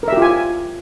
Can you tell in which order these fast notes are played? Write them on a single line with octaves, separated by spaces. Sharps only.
A#4 E5 G4 F4 G#5